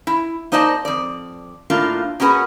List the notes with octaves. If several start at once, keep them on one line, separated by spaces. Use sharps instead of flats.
E4
A#3 D#4 C5 D5 D#5 A5
F2 D5
A2 A#3 D4 F4
A#3 C#4 F#4 G#4 B4